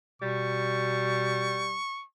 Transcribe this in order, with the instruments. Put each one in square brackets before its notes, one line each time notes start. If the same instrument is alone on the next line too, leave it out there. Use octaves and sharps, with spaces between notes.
[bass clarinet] B2 [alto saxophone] G3 [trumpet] C#6